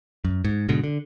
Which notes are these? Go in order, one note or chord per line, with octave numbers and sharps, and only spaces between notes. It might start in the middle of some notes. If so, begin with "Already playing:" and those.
F#2
G#2
G#2 B2 D3
D3